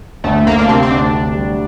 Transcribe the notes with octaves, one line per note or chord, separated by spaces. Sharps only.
D2 A3
D2 A#3
D4
C3 C4
C4
D2 D4
D2
G3